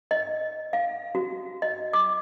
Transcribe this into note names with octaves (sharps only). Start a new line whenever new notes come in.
D#5
F5
F#4
D#5
D6